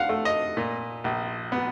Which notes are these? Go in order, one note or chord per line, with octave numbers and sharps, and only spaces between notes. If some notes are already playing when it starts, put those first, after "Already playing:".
Already playing: D4 F5 F#5
A3
D#5
A#2
A#1
B3